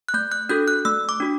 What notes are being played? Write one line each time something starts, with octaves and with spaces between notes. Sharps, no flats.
F#6
A3 G6
F#6
D4 F#4 A4 G6
F#6
A3 E6
D6
D4 F#4